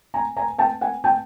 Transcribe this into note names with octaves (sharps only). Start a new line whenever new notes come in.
G#5 A#5
G#5 A#5
G5 A5
F#5 G#5
G5 A5